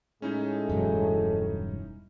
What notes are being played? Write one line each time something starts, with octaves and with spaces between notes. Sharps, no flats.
A2 G#3 C#4 D#4 E4
E1 G2 F#3